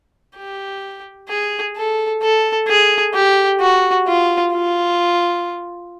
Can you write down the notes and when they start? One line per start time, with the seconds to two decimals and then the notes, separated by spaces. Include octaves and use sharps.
0.37 G4
1.29 G#4
1.76 A4
2.22 A4
2.68 G#4
3.14 G4
3.61 F#4
4.07 F4
4.53 F4